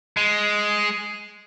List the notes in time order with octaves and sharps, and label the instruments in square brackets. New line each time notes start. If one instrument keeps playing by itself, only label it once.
[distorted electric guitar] G#3